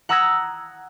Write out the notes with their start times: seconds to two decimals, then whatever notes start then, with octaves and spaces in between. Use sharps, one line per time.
0.09 F#5 A#5 D#6 E6 G#6 A#6